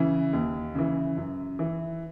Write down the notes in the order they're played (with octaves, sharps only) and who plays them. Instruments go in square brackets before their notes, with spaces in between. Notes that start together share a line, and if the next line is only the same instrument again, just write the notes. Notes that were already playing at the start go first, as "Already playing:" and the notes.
Already playing: [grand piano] C#3 E3
D#2
C#3 E3
F#2
E3